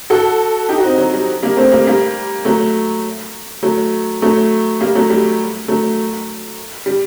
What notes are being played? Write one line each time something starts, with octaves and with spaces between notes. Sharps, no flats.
F#4 A4
D#4 G4
F#4
C4 D#4
F#3
G3
G3 A#3
A3 C4
G3 A#3
G3 A#3
F#3 A3
F#3 A3
F#3 A3
G3 A#3
F#3 A3
G3
F#3 A3
G3